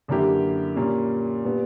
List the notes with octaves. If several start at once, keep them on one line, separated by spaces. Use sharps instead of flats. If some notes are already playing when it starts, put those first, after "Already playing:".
F#2 D3 A#3 E4 G4
A#2 G3 A#3 C#4
A#2 G3 B3